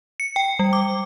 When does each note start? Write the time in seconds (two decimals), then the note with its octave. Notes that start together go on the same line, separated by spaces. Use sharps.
0.20 C#7
0.36 G5
0.59 G3
0.73 D6